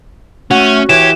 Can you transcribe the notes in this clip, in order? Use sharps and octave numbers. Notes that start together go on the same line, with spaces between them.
A3 C#4 F#4
E3 G4 C#5 E7